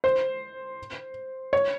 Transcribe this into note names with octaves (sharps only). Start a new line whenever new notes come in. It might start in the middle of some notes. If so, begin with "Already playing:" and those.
C5
C#5